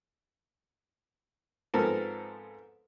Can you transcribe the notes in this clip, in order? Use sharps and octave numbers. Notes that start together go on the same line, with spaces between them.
G#2 F3 B3 C4 A4 A#4